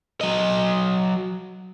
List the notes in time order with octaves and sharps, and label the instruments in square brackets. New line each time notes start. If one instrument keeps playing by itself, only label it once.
[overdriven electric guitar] F#3 D#5